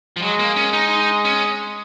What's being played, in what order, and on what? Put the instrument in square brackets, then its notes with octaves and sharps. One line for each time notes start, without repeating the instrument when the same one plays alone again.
[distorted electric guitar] F3
[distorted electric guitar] F#3 [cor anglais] G#3
[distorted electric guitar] A#3
C#4
D#4
C#4